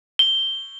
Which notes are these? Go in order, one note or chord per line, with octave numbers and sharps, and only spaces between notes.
G7